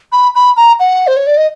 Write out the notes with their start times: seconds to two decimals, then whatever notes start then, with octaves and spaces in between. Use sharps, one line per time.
0.12 B5
0.35 B5
0.57 A#5
0.80 F#5
1.07 C5
1.17 C#5
1.27 D5
1.37 D#5